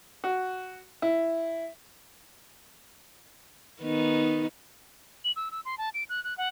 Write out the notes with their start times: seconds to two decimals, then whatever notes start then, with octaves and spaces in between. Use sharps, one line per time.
0.24 F#4
1.02 E4
3.81 D#3 B3 D#4
5.24 F#7
5.36 E6
5.51 E6
5.65 C6
5.78 A5
5.94 D7
6.09 F#6
6.24 F#6
6.38 F#5